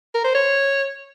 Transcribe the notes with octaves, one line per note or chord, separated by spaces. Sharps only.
A#4
C5
C#5